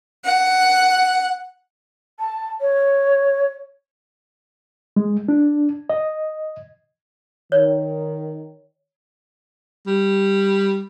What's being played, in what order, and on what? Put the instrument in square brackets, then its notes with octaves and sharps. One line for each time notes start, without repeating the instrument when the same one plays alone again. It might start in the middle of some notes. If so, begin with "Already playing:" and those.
[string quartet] F#5
[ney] A5
C#5
[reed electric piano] G#3
D4
D#5
[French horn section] D#3 [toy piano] C#5
[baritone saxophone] G3